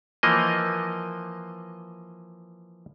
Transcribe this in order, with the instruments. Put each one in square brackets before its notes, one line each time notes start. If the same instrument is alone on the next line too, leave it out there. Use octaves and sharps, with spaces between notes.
[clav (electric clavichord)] E3 F3 A#3 D#5